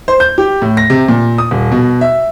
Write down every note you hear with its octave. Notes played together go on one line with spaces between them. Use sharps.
C5
G6
G4
A2
A#6
C3
A#2
D#6
D#1
B2
E5